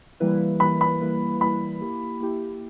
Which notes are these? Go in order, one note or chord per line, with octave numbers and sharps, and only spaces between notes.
E3 G3 A#3 E4 B4
E3 G3 A#3 E4 B4 B5
B5
E3 G3 A#3 E4 B4
E3 G3 A#3 E4 B4 B5
A#3 E4 G4
A#3 E4 G4